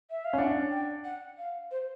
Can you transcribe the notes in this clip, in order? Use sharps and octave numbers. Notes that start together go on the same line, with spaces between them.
E5
F5
C#4
D4 F#5
G5
F#5
F5
C5